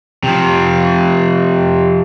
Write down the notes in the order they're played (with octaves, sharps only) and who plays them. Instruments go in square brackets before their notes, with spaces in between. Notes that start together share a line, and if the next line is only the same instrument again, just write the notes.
[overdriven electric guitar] C3 F3